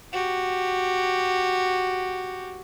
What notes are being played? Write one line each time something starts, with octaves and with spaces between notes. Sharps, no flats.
F#4 G4